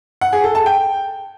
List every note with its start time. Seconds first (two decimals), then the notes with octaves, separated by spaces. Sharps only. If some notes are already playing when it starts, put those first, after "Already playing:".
0.21 F#5
0.33 G#4
0.44 A4
0.55 A5
0.66 G5